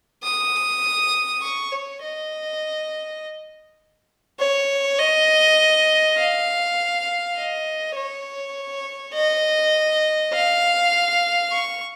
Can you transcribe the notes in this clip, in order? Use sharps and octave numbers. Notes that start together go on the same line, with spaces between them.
D#6
C#6
C#5
D#5
C#5
D#5
F5
D#5
C#5
D#5
F5
C#6